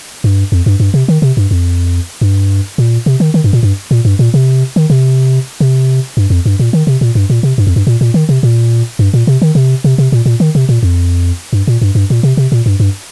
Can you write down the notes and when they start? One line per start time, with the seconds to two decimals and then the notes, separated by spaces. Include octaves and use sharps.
0.24 G2
0.52 F2
0.66 G2
0.80 G2
0.94 C3
1.08 D#3
1.22 C3
1.37 G2
1.51 F2
2.21 G2
2.78 A#2
3.06 C3
3.20 D#3
3.34 D#3
3.44 G2
3.53 A#2
3.63 G2
3.91 A#2
4.05 G2
4.19 A#2
4.34 C3
4.76 D#3
4.90 C3
5.60 C3
6.17 G2
6.30 F2
6.46 G2
6.59 A#2
6.73 D#3
6.87 C3
7.01 A#2
7.15 G2
7.30 A#2
7.43 C3
7.58 G2
7.67 F2
7.76 G2
7.87 A#2
8.01 A#2
8.14 D#3
8.29 C3
8.43 A#2
8.99 G2
9.14 A#2
9.27 C3
9.42 D#3
9.55 C3
9.84 C3
9.98 C3
10.12 A#2
10.26 A#2
10.40 D#3
10.55 C3
10.69 A#2
10.83 F2
11.53 G2
11.67 A#2
11.82 G2
11.95 G2
12.10 A#2
12.23 C3
12.37 C3
12.52 A#2
12.66 G2
12.80 G2